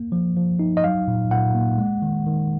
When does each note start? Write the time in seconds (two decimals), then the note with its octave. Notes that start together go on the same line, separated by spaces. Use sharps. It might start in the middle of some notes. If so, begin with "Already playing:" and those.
Already playing: A#3
0.12 F3
0.37 F3
0.59 D#4
0.77 D#5
0.84 F#3 F5
1.08 A#2
1.31 A#2 F#5
1.55 A#3
1.78 G#3
2.02 D#3
2.27 D#3